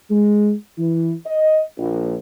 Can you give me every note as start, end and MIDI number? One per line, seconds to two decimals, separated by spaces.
0.11 0.53 56
0.78 1.12 52
1.26 1.60 75
1.77 2.16 34